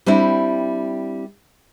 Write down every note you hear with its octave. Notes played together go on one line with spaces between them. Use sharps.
G3 C4 D4 E4